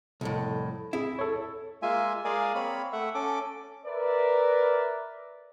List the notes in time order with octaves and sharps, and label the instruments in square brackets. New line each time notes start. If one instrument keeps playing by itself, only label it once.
[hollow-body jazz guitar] C2 F2 A2
[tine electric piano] C4 G#4 [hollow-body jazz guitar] E4
[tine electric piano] A4 C#5
[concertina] G#3 A#3 F4 E5 G#5
G#3 G#4 A#4 D5 F5 G#5
A#3 C4 C#5 B5
A3 E5 F#5
C#4 A4 D6
[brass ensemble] A#4 B4 D5 E5